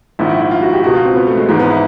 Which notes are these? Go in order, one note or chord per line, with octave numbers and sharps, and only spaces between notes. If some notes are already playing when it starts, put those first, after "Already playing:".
A#1 G#2 D#3 E4
E4
E4
F4
F#4
G4
C#2 B2 F#4
F4
C4
B3
A3
G#3
G#1 G#2 E3 G#3
B3
E4